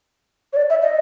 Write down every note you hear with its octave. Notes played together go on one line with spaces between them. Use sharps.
C#5
D5
E5
D#5